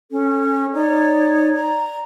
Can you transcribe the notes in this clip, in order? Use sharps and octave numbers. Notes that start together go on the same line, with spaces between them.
C#4 A4
D#4 C#5 D5
D5 A#5